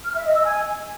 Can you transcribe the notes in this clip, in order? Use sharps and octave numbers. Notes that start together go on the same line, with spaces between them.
F6
E5
D#5
E6
G#5